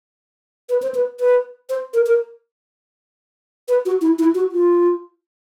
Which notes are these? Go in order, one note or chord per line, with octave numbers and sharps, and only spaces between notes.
B4
C5
B4
B4
C5
A#4
A#4
B4
F#4
E4
E4
F#4
F4